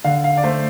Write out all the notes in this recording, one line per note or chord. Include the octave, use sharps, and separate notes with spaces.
D3 F5
F5
D5
A3 C5